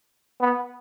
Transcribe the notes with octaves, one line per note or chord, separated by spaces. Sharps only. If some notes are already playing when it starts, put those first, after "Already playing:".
B3